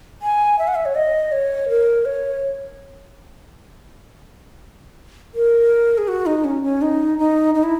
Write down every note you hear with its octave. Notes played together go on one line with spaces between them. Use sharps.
G#5
E5
F#5
E5
C#5
D#5
C#5
A#4
C#5
A#4
G#4
F#4
D#4
C#4
C#4
D#4
D#4
D#4
E4